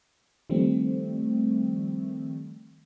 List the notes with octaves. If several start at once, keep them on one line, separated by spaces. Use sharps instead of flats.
D#3 F3 G3 A3 C4